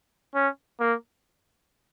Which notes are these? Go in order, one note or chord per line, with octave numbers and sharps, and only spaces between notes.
C#4
A#3